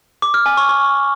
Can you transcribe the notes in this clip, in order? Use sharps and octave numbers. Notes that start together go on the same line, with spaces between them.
D6
F6
G#5
C#6
C#6